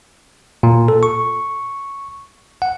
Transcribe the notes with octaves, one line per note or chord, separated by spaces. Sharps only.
A#2
A4
C#6
F#5